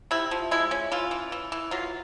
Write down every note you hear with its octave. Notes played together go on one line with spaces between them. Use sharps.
C3 E4
F3
G#3 E4
C#4
E3 F4
E3
E3
E3
F#3 F4